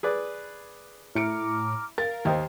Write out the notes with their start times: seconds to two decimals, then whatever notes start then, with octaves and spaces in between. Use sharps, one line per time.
0.03 G#4 B4 D5
1.15 A2 E4 A#5 D6 F6 C#7 D7
1.98 A#4 F5 A6
2.25 D#2 C5 D#5 G5